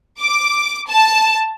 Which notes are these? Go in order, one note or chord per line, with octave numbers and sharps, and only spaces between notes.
D6
A5